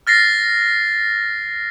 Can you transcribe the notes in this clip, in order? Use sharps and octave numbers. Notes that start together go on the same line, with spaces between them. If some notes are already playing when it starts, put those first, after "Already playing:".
F6 A6 A#6 C7